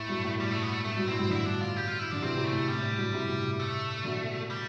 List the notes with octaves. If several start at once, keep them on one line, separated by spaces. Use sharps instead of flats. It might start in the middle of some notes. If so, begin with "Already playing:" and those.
Already playing: A2 A3
G2 B2
A2
G3
A3
B3
A3
G2 A3
G2 B2
A2 C4
G2 B2
B2 D3 E4
D4
F4
G4
F4
E4
D3 D4
C3 E3 C4
A2 C3
A3
A2
A2 G3
A2
G2 B2
A2 C3
A3
B2 D3
G3